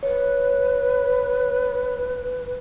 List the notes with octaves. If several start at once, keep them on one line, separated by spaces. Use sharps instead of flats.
B4 C#5